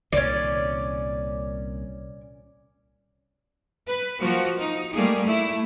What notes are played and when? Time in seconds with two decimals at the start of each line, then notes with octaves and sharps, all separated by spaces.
0.13 C2 A#2 D#3 C#4 D5
3.87 B4
4.20 F3 A#3 F#4
4.58 D#4
4.92 G3 A3 A#3 G#4
5.24 A3 E4